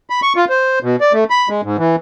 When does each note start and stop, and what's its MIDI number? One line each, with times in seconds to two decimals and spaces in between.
0.10 0.20 83
0.22 0.33 85
0.36 0.45 65
0.49 0.79 72
0.83 0.96 47
1.01 1.13 74
1.13 1.24 57
1.30 1.49 83
1.49 1.61 56
1.63 1.77 44
1.78 1.96 52